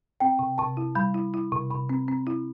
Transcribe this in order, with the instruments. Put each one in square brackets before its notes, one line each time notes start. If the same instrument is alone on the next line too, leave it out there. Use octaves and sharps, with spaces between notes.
[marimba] C4 [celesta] G5
[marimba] C3
[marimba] C3 [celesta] A5
[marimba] E4
[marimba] G3 [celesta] B5
[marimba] E4
E4
C3
[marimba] C3 [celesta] B5
[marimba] C4
C4
E4